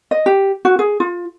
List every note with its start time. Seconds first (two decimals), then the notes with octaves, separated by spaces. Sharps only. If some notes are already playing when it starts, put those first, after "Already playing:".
0.11 D#5
0.26 G4
0.65 F#4
0.79 G#4
1.00 F4